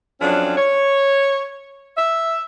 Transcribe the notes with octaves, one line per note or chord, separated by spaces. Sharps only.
F2 F#3 C#4 D4
C#5
E5